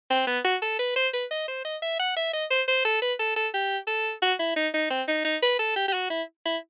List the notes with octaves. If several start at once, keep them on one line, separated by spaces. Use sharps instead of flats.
C4
B3
F#4
A4
B4
C5
B4
D#5
C5
D#5
E5
F#5
E5
D#5
C5
C5
A4
B4
A4
A4
G4
A4
F#4
E4
D#4
D#4
C4
D#4
D#4
B4
A4
G4
G4
F#4
E4
E4